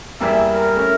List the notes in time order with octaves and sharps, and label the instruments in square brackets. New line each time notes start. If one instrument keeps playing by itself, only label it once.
[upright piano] E2 E3 G3 A#3 [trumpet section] E5
[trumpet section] A#4
[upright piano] A3 C#4 E4